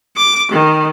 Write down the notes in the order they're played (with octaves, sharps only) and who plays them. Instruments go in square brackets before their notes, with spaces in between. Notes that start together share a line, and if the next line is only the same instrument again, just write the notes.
[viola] D6
D#3